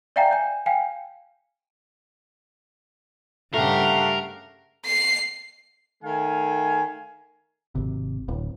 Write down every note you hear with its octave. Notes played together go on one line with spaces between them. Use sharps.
D5 E5 F5 G5 G#5 A#5
G#5 G6
F5 G5 G#5
G2 C#3 A3 G4 A#4 F5 F#5
C7
D#3 A3 F5 G#5
G#1 C3
D1